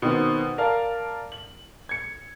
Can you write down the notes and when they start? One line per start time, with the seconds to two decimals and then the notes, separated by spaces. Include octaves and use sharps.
0.02 B2 D#3 C4
0.58 A#4 D5 F5 A5
1.32 F#7
1.89 G#6 C#7